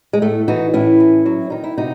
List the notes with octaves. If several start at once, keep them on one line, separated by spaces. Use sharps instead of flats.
G#3
A2 A3
E3 D#4 F#4
A2 C#4 E4
E3
F#3
D#3 D#4
E4
C3 D#4 F#4